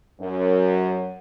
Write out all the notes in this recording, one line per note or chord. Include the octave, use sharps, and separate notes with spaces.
F#2